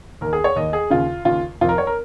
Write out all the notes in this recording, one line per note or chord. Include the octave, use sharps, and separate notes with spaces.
D#2 D#3 A#4
G#4
C#5
D#2 D#3 D#5
G#4
D#2 C#3 F4
D#2 C#3 F4
F1 F2 D#3 F4
A#4
C#5
A#4